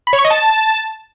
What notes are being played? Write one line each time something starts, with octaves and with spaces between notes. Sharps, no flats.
B5
C#5
C#6
D#5
A5